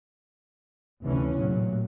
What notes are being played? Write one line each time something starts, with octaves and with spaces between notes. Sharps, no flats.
F1 D2 D3 E3 C#4
A1 E2 A#2 F#3